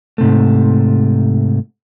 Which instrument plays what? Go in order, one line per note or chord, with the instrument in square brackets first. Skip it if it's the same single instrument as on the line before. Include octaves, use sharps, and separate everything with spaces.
[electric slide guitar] G#2 C3 A3